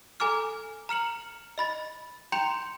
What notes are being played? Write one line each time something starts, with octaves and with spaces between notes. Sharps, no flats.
A4 G#5 A#5 D6 F6
A#5 F6 C#7 F#7
D#5 B5 A6
G5 A#5 C6 G6 C#7 F7